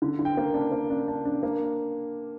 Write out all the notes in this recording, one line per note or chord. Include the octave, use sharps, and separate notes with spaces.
D3
D3
G5
A#3
D4
A#3
D4
D4
D4
A#3